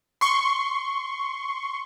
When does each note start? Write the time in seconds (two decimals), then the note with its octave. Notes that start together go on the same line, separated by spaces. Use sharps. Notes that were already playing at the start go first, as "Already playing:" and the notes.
0.21 C6 C#6